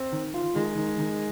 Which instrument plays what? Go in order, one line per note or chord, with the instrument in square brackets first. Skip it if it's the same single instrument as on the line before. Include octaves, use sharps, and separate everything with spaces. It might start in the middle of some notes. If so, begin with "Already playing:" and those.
Already playing: [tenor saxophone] C4
[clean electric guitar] D#3
F4
[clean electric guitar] D#3 [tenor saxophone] G#3
[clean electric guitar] D#3
D#3